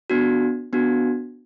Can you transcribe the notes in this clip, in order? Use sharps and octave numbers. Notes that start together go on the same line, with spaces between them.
B3 D4 F#4
B3 D4 F#4